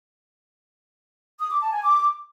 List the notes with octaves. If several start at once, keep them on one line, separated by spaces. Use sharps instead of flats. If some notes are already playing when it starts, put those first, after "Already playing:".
D#6
D6
A5
G#5
D6